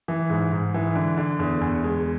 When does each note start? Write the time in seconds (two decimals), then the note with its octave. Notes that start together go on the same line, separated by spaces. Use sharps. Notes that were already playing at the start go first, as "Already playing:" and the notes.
0.08 E3
0.30 G#2
0.52 G#2
0.74 E3
0.95 D3
1.17 D3
1.39 E2
1.61 E2
1.84 G#3